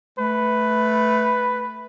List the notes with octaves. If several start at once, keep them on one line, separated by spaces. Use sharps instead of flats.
A3 B4